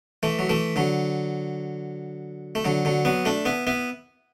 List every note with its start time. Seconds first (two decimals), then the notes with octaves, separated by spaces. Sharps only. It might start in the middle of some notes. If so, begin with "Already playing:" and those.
0.23 E3 A3
0.39 F#3
0.49 E3 A3
0.76 D3 F#3
2.55 A3
2.65 D3 F#3
2.85 D3 F#3
3.05 F#3 B3
3.25 A3 D4
3.45 B3 E4
3.67 B3 E4